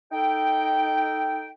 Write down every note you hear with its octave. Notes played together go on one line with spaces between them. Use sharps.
D#4 A4 G5